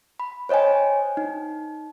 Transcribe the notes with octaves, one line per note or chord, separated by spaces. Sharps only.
B5
C5 C#5 D#5 G5 G#5
D#4